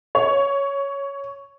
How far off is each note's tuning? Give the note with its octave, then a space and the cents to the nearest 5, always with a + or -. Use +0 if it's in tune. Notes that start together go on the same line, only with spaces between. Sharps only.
C#5 +5